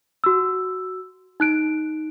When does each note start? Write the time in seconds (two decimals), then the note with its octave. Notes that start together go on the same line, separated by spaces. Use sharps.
0.24 F#4 E6
1.40 D#4 F#6 D7